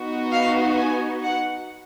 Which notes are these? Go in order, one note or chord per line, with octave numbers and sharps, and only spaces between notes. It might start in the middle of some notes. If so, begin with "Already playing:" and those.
Already playing: B3 D#4 F#4
F5
G#5
F#5